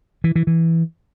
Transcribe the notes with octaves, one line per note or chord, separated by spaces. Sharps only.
E3
E3
E3